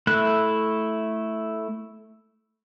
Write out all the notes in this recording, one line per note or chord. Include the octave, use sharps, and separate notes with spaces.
A3 E4 F#6